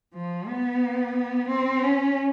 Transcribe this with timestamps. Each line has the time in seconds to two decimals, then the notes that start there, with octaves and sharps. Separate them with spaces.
0.14 F3
0.48 B3
1.49 C4
1.83 C#4